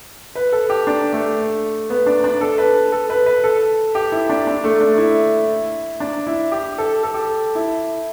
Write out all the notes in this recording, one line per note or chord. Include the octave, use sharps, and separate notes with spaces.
B4
A4
G4
D4
A3
B3
D4
D4
A4
B4
A4
B4
B4
A4
G4
E4
D4
D4
A3
D4
E4
D4
E4
G4
A4
A4
G4
A4
E4